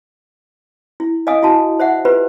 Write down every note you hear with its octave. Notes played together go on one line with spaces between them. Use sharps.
E4
D#5 F5 G#5 D#6
E4 F#4 A5
C5 E5 F#5
F4 G4 B4 C5